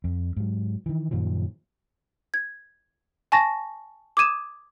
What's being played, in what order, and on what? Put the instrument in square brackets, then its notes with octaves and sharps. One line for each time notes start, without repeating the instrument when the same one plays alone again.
[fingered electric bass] F2
G#2 F#3
D#3 E3
F#2 A#2 D#3 F3
[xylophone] G#6
G#5 A5 C#6 A6 A#6
D6 D#6 G#6 D#7 E7